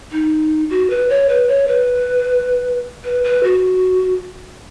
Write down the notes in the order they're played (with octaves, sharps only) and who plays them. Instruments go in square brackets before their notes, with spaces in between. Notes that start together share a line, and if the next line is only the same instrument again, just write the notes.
[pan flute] D#4
F#4
B4
C#5
B4
C#5
B4
B4
B4
F#4